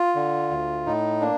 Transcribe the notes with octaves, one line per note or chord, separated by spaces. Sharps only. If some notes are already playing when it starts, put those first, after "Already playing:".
Already playing: F4
D3
D2
A2 D#4
A#3 D4